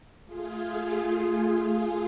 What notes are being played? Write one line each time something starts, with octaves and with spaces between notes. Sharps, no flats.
A3 F4 G#4